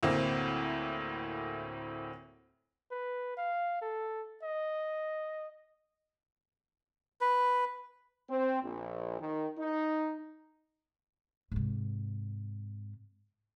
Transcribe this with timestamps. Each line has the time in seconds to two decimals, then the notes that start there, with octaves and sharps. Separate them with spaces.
0.03 D2 A2 A#3 C4
2.91 B4
3.37 F5
3.81 A4
4.43 D#5
7.21 B4
8.29 C4
8.63 A#1
9.20 D#3
9.58 D#4
11.52 G#2 C3